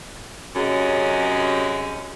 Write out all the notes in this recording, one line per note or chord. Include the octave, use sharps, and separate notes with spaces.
F#2 C3 F#3 G#3 C#4 G#4